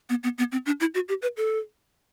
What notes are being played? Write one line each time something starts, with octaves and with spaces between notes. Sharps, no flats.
B3
B3
B3
C4
D4
E4
F#4
G4
B4
A4